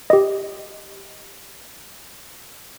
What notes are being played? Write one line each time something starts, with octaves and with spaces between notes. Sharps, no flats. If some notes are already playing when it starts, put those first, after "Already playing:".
G4 D#5